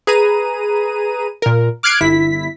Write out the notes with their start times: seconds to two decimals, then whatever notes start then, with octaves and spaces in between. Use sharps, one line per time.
0.07 G#4 B4 A#5 D#7
1.42 A#2 A#4
1.83 D6 F6 F#6 G#6 C7 D7
2.01 G1 E4 B6